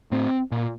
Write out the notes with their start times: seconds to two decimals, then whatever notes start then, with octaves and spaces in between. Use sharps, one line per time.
0.11 A2 C4
0.52 A#2